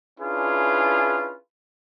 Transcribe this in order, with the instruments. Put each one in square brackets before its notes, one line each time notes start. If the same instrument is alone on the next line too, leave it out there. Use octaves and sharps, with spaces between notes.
[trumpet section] C#4 D4 E4 F4 G#4 B4